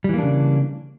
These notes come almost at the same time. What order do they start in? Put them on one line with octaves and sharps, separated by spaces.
G3 E3 A#3 D4 C#3